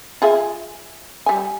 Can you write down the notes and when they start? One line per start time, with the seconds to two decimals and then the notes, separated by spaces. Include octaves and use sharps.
0.22 F4 G#4 E5
1.26 G3 G#5